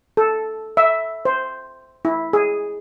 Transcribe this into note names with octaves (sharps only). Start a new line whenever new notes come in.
A4
E5
C5
E4
G#4